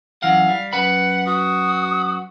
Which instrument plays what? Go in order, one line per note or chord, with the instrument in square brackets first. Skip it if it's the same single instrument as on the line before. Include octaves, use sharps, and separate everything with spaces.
[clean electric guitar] F#2 E3 F#5 [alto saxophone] F5
[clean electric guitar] G3
[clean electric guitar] F#2 B4 B5 [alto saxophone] F#5
[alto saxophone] F#4 [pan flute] D#6